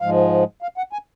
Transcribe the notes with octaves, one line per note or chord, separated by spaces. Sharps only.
G#2 F3 G#3 F5
F5
F#5
G#5